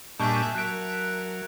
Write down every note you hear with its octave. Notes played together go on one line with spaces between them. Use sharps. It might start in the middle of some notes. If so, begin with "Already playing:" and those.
A#2 G3 D4 G#4 E5 A5 C#6 G6
F#3 A#4 E5 F#6 D7